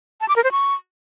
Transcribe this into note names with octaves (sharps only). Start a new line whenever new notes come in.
A5
D6
A#4
C5
C#6